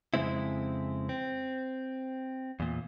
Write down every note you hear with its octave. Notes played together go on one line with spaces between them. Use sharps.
F2 A#2 C#3 G#3 C4 E4
C4
E2 A#2